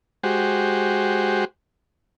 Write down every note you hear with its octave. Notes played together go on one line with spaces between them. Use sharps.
G#3 F#4 G4 C5